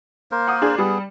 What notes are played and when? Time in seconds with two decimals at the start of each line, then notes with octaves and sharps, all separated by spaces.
0.31 A#3 A#4 C5
0.48 F#5 C6 D#6
0.62 D4 G#4
0.78 G3 B3 G#4